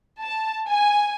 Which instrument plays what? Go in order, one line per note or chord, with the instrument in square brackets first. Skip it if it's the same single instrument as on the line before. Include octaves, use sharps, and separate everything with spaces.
[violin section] A5
G#5